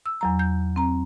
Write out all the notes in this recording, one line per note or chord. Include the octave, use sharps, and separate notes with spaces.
E6
E2 F#3 A#5
G6
C4 A#5